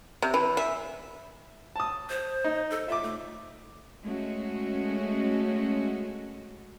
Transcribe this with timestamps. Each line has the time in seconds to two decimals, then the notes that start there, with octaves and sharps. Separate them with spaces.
0.22 C3
0.34 E3
0.57 E5
1.76 A5 D#6
2.10 C5
2.44 D#4
2.70 A4
2.88 F4 E5 D6
3.03 A3
4.03 G#3 A3 C#4 F#4